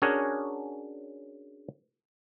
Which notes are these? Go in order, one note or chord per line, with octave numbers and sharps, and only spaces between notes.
C#4 D4 F#4 G#4 A#4 C#5